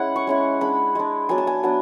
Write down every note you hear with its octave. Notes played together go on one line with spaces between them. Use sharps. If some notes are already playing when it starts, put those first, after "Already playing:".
Already playing: G#3 C#4 E4 F#5
C#6
G#3 C#4 E4
G#3 D4 B5
G#3 D4
F#3 B3 D4 G#5
A5
G#5
F#3 B3 D4